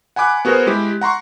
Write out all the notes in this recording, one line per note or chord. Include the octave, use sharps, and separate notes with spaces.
F#5 G#5 B5 D6 F#6
B3 F#4 G#4 A#4 C5
G#3 E4 G4
F#5 A#5 C6 C#6